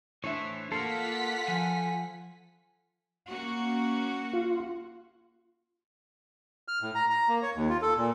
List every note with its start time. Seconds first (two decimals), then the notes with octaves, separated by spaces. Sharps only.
0.24 A2 E3 D4 C5 C#5 E5
0.72 A#3 F4 A4 F5 F#5 C6 B6
1.48 F3 G#5
3.29 A#3 C#4 F#4
4.33 F4
6.68 F6
6.82 A2
6.95 A#5
7.10 A#5
7.29 A#3
7.42 C#5
7.55 D#2
7.69 F4
7.82 A4
7.97 A#2